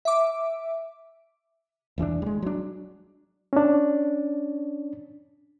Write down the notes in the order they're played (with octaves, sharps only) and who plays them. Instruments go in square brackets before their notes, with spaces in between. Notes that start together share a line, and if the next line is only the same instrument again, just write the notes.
[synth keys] E5 D6
[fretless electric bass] E1 E3 C4 D4
G3 G#3
F#3 D4
[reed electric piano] C#4 D4